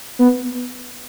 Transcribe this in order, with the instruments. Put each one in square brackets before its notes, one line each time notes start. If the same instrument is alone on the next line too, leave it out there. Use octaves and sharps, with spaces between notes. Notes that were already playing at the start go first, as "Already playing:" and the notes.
[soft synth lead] B3